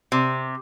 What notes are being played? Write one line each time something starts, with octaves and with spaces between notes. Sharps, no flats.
C3